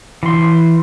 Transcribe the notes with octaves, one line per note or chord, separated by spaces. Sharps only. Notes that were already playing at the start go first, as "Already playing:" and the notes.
E3 C6